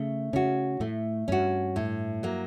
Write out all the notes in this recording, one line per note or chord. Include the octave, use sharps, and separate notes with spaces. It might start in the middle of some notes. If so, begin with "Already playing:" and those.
Already playing: C#3 A3
C#3 C#4 F#4
A2 A3
G2 C#4 F#4
A2
F#3 A#3